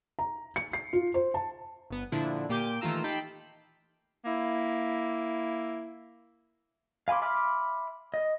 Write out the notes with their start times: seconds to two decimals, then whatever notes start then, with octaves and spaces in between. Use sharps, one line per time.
0.19 A#5
0.56 C#7
0.73 C7
0.93 F4
1.14 C5
1.34 A5
1.90 G1 B3
2.12 A#2 D3 F3 D4 E4
2.49 A#2 A#3 G4 D6 G6 D#7
2.81 D#3 E3 A3 F4 A#5 E6
3.04 D#4 G4 G5 A5 B5 C7
4.25 A#3 E4
7.08 F5 G#5 B5 C6 D6
7.22 E5 B5 C6 D6 F6
8.14 D#5